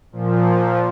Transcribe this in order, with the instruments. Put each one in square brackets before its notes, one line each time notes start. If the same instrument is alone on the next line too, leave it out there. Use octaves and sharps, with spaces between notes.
[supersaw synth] A#2 F3